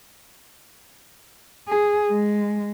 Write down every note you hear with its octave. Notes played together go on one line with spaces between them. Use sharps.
G#4
G#3